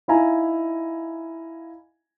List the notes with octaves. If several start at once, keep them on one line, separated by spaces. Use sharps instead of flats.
D#4 E4 F5 G#5 A#5